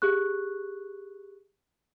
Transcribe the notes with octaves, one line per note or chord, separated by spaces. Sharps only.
G4 G#4 C#6 F#6